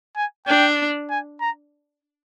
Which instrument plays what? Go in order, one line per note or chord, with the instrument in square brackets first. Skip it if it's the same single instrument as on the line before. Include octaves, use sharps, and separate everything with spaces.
[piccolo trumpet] G#5
[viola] D4 [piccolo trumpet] G5
[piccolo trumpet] G#5
A#5